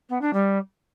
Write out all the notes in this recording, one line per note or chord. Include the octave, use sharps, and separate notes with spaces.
B3
D4
G3